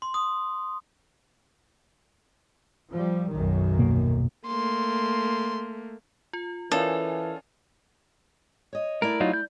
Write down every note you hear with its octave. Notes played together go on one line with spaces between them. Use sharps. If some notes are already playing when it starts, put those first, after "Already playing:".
C6
D#6
F3 G3
B1 F#2 D#3
D#1 B2 A#3
A3 A#3 C6
F4
E3 C#4 F4 A4 A#4 D5 G#5
C#5 D#5
A3 E4 A#4 D5
F#3 D#4 F4
G6